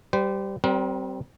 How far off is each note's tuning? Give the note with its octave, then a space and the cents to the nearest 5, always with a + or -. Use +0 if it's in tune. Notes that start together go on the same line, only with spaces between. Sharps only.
G3 -5 C5 -35
G3 -30 C4 +0 A#4 +40